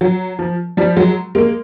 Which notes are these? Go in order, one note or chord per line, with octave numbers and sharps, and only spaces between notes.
F#3
F3
F3 G3
F#3 G#3
G#3 A#3